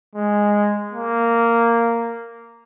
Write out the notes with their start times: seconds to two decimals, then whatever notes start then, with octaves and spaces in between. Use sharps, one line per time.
0.16 G#3
0.93 A#3